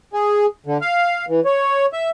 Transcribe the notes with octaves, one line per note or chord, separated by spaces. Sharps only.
G#4
D3
F5
E3
C#5
E5